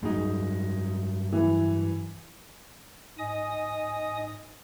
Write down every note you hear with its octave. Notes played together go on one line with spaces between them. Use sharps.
G2 F#3 G#3 D#4
E3
G#2 D#5 G#5 D#6